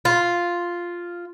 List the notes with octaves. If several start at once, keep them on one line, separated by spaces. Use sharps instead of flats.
F4